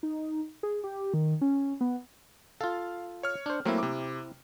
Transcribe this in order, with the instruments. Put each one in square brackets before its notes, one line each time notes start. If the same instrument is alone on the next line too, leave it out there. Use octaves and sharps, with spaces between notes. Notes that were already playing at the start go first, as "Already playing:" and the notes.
[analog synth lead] D#4
G#4
G4
D#3
C#4
B3
[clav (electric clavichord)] F4 A4 [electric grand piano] F5
[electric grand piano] C#5 F6
[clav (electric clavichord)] D4 C5
[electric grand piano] F#3 A3 A#3 [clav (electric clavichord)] C4 E4
[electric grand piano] C3 D6